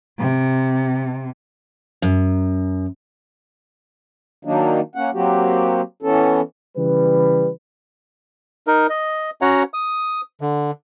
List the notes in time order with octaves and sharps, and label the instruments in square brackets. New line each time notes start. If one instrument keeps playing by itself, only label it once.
[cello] C3
[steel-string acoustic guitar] F#2
[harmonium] D#3 F#3 A#3 D4 D#4
A#3 C#4 F#5
F#3 A#3 C4 F#4 G4
E3 B3 C#4 A4
[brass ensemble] C#3 E3 G3 B4
[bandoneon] D#4 A#4
D#5
C#4 F#4 C#5 F#5 A#5
D#6
D3